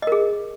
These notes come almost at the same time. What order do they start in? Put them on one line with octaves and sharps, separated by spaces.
D#5 A#4 G#4